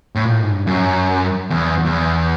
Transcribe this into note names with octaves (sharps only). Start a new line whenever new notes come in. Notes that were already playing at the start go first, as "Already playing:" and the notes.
A2
A#2
A2
G#2
G2
F#2
E2
E2